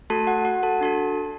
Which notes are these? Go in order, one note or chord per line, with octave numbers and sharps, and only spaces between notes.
A3 F#4 A4 A5
F#4 F#5
F#4 F#5
A4 A5
D4 F#4 A4